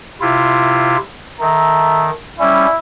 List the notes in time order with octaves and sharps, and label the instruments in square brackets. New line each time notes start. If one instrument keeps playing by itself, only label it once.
[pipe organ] C3 E4 F4
[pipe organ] D#3 [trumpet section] A4 E5 A#5
[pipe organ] G3 C#4 [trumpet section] E4